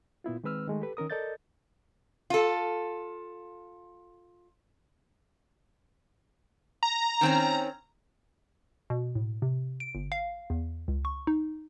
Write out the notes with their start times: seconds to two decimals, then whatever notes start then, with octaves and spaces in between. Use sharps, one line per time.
0.24 A#2 B3 E4 F4
0.44 D#3 G#3 C4 B4 E6 F6
0.67 D#3 G#3 A3
0.81 G4 A4 B4
0.97 D#3 C#4 A#4 D#6
1.10 A4 A#4 D5 D#5 G6 A6
2.30 F4 A4
6.83 A#5
7.21 D#3 C4 C#4
8.90 B2
9.15 A2
9.42 C3
9.80 D7
9.95 G1
10.12 F5
10.50 E2
10.88 C#2
11.05 C#6
11.27 D#4